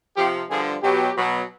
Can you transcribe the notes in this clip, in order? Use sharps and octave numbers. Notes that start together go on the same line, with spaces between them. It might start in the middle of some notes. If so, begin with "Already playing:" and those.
C3 F3 G4
G2 D3 F3 G#4
B2 F#3 G4
B2 F#3